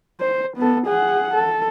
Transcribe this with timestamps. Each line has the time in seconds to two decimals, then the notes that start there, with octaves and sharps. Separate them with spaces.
0.20 C5
0.57 B3 A4
0.86 G#4 F#5
1.34 A4